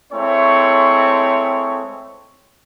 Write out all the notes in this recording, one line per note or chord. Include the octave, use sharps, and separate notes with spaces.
G#3 A3 C4 E4 C#5 C#6